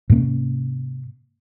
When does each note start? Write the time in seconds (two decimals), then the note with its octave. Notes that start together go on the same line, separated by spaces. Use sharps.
0.10 G#2 C3 A#3 C#4